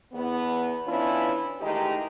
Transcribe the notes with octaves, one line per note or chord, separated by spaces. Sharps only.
E2 B3
E3 B3 C#4 D4 E4 F4
D#3 E3 G#3 A3 D#4 G4